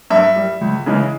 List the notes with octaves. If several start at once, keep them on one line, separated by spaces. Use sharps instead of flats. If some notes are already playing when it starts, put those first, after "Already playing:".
G2 E5
G3
C#2
C#3 E3 G#3